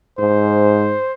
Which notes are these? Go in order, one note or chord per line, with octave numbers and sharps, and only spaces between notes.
G#2 C5